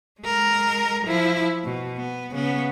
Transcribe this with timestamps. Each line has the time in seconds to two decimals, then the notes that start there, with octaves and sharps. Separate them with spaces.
0.20 G#3 A#4
1.05 F3 E4
1.64 B2
1.96 B3
2.31 C#3 B3